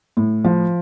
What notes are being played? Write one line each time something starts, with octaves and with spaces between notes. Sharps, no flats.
A2
F3